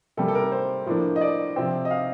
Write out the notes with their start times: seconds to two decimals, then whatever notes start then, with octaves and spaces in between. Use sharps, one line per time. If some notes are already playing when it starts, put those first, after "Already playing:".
0.17 C3 G3 A#3 A4
0.28 A4
0.35 A#4
0.52 C5
0.86 A2 F3 A#3 D4
1.16 D#5
1.21 D5
1.56 C3 F3 C4
1.85 D#5
1.91 F5